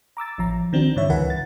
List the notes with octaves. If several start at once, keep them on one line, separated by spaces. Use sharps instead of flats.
A#5 D6 E6 A6
A1 F3 A#5
D#3 C4 D4 F#4
G2 D3 E3 C#5 E5
C#2 E3 A#4 B4 F#5
A6